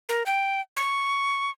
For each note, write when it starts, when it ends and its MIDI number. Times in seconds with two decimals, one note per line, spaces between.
0.09 0.23 70
0.26 0.61 79
0.77 1.50 85